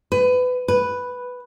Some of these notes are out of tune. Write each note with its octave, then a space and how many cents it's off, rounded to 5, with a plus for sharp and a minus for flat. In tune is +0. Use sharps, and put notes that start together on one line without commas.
B4 +25
B4 +0